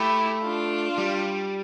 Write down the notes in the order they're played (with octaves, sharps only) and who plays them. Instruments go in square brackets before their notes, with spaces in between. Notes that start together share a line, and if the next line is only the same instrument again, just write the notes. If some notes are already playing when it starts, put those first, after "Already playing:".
Already playing: [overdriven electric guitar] A3 [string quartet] E4 G4
[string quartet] D4 F4
[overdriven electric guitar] G3